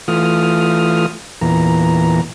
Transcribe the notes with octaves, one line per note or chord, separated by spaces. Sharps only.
E3 A3 F4 D#6 F6
E2 A#2 E3 A#5